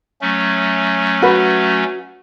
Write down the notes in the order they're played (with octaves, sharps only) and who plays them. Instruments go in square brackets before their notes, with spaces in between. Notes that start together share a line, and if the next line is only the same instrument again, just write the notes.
[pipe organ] F#3 A3 C#4
[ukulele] F#4 B4